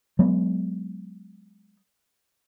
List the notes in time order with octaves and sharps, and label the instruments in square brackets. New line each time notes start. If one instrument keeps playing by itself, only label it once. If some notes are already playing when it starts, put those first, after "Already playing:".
[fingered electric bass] F#3 G#3 B3